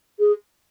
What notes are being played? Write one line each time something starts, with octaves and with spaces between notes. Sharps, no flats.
G#4